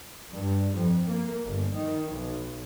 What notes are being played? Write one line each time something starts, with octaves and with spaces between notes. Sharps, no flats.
G2
F2
A#3
G1
D#3
B1